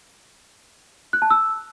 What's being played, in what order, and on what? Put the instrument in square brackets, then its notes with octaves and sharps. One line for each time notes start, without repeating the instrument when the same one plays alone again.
[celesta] F#6
A5
E6